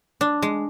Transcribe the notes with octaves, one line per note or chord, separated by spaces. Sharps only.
D4
G#3